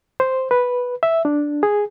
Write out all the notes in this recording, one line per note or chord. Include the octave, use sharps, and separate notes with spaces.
C5
B4
E5
D4
G#4